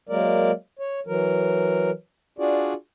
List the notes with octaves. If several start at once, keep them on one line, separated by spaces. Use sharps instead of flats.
F#3 G#3 A#3 A#4 D5
C#5
E3 F#3 A#4
D4 F4 F#4 G#4 D5